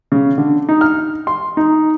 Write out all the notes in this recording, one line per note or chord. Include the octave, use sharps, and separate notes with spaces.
C#3
D3
D#4
F6
C6
D#4